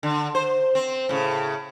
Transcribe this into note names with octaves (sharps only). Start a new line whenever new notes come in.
D3
C5
C4
A2 C#3